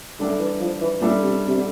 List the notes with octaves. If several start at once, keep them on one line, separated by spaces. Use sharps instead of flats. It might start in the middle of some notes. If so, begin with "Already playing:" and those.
D3 G3 D4 A4 E5
E3
F3
E3
A#2 G3 D4 A4 E5
C3
C3
D3